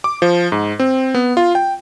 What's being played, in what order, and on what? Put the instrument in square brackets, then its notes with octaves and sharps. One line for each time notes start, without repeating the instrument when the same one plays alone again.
[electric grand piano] D6
F3
G#2
C4
B3
F4
G5